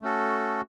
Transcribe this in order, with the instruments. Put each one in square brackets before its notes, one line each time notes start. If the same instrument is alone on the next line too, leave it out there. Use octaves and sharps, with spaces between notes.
[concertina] A3 C#4 F#4 A4